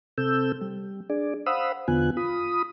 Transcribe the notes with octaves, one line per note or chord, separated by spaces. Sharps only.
C3 C4 A4 E6 G6
G3
D4 G#4 D5
C5 F5 F#5 B5 D#6 E6
E2 D3 B3 F4 G#5 F#6
F4 B5 D#6